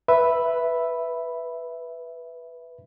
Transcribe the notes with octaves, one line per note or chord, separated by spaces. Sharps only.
B4 E5 B5